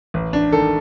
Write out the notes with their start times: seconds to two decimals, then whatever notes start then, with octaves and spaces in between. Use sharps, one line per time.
0.14 A1
0.33 D4
0.52 D#3 A4